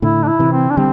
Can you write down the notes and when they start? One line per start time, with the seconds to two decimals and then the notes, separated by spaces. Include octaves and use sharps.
0.02 A2 D3 E4
0.23 D4
0.27 E4
0.39 C3 E3
0.52 C4
0.71 D4
0.77 D3 G3 C4